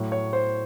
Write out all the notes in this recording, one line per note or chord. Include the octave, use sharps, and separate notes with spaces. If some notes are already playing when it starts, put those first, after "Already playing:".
Already playing: A2 F#3
C#5
C5